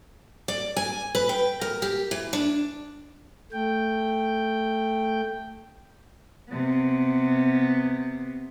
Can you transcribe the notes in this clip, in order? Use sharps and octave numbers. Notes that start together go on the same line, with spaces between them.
D5
G#5
B4
G5
A#4
G4
E3
D4
A3 G5
C3 B3